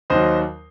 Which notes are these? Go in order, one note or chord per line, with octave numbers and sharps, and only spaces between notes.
D#2 D#3 F#3 C5 D#5